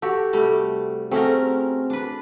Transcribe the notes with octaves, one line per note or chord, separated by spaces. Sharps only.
F#4 G4 A4
C3 G3 A3
A3 C4 C#4 F#4 G#4 A#4
D4 B4